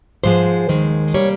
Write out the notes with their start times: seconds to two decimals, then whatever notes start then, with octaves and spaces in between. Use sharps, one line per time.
0.24 G#2 F3 G#3 C5
0.69 D#2 D#3 G#3
1.14 C3 G3 A#3 C#5